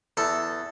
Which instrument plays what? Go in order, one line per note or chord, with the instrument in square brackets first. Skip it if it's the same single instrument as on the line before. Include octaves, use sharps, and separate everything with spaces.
[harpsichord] E2 A4